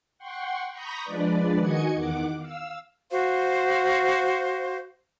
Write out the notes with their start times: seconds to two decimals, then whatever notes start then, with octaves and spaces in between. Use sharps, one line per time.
0.18 F#5 G5 C6 C#6
0.72 A#5 B5 C#6 D#6 G6 A#6
1.04 F3 G#3 D4 B4 D5
1.58 D#3 F#4 D#5 G#5 G#6 C#7
1.94 E2 D#3 F#5 D6
2.39 F5 E6
3.10 F#4 C5 F5